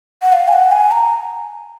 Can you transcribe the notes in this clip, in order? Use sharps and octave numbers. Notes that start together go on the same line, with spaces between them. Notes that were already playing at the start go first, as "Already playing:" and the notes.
F#5
F5
G#5
F#5
G#5
A#5